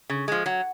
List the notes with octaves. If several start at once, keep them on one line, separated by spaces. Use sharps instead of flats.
C#3
F3 G#3
F#3 F#5